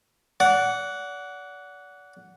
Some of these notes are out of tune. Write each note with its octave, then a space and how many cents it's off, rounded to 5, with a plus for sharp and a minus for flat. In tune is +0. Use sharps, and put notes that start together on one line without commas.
D5 -35 F#5 +0